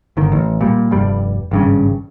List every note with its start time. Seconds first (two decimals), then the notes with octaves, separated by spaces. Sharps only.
0.17 G1 D#3
0.32 A1
0.61 A#2 G3
0.91 F1 G2 G3
1.51 G#1 G2 C#3